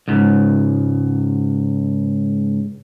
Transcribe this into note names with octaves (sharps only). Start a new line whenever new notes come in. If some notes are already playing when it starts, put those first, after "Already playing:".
C#2 G#2